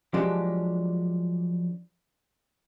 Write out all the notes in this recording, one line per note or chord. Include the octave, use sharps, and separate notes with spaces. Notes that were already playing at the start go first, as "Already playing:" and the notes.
F3 F#3 G#3 D4 G4